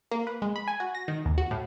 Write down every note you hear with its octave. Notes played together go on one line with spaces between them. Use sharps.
A#3
B4
G#3
B5
G#5
F#4
A#6
D#3
D#2
F#4
A2